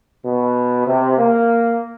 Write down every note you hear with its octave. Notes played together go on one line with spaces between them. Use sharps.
B2
C3
A#3